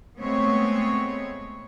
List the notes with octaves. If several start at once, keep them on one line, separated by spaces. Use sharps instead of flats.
G#3 A3 B3 C4 C#5